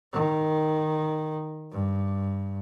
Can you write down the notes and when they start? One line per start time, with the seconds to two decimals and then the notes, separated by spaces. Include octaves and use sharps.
0.13 D#3
1.72 G2